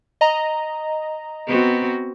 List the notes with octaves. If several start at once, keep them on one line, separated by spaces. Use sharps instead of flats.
D#5 A#5
B3 C4 F#4